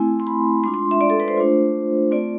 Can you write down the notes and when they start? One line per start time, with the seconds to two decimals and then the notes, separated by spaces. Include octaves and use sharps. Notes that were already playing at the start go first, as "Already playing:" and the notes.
Already playing: A3 C4 E4 G#5
0.20 C6
0.27 B5
0.63 G#3 D4 F4 C6
0.74 C6
0.91 E5
1.01 D5
1.10 A4
1.20 B4
1.28 C5
1.37 A3 D4 F4
2.11 A3 C4 F4 D5